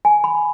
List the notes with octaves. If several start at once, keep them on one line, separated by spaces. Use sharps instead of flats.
G#5
B5